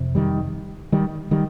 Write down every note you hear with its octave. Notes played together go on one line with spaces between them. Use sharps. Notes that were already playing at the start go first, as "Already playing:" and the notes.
Already playing: F2 C3
D#3 G3
D#3 G3
D#3 G3